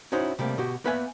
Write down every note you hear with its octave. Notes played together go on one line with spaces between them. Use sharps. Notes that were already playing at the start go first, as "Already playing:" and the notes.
C#4 D#4 E4 F#4 C5
C3 G3 A3 A#3
B2 F#4 G4
A#3 B3 B4 E5 F5 G#5